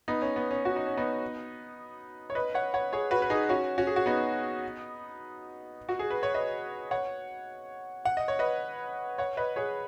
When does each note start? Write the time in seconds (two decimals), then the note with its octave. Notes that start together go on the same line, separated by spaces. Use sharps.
0.08 B3 D#4
0.22 C#4
0.36 B3
0.51 C#4
0.65 F#4
0.76 D#4
0.86 C#4
0.97 B3 D#4
2.30 C#5
2.35 B4 D#5
2.54 C#5 F#5
2.74 C#5 F#5
2.93 G#4 C#5
3.11 F#4 B4
3.22 B4
3.30 D#4 G#4
3.49 C#4 F#4
3.78 C#4 F#4
3.87 G#4
3.96 F#4
4.06 B3 D#4
5.89 F#4
5.99 G#4
6.11 B4
6.23 C#5
6.34 B4 D#5
6.91 C#5 F#5
8.05 F#5
8.17 D#5
8.28 C#5
8.39 B4 D#5
9.18 C#5 F#5
9.37 B4 D#5
9.56 G#4 C#5